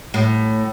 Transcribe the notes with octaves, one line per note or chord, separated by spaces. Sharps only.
A2